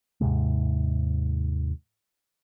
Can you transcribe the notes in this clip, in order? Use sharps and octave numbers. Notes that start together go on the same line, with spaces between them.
D#2 G#2 C3 G#3